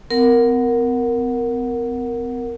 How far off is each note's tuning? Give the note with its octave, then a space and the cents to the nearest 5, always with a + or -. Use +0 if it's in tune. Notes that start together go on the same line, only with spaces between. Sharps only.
C4 -40 A#4 +0 F#5 -10